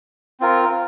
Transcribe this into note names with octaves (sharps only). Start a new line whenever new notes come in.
C4 F4 A#4